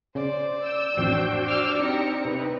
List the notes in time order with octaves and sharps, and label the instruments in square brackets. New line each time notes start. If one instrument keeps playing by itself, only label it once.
[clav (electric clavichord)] C#3 C#4 [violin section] C5 [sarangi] D5
[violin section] E6 G6
[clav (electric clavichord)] A1 F2 A2 [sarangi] D4 [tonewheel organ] F#4 C5 G5
[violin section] D6 E6 F6
[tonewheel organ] C4 D#4 [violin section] G4 A#5 C#7
[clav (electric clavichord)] C3 [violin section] B4